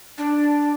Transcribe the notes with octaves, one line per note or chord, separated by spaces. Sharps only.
D4